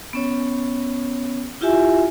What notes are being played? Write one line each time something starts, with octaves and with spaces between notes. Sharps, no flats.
B3 C#4 C#5
E4 F4 G4 E5 G#5